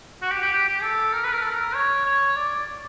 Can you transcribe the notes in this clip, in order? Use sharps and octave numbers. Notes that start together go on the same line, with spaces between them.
F#4
G4
G4
G4
G4
A4
A#4
B4
A#4
A4
A#4
C#5
C#5
D5